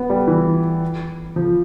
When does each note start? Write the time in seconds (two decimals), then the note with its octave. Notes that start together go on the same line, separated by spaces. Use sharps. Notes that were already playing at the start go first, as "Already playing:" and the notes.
Already playing: B3
0.10 G3
0.28 E3
1.36 F3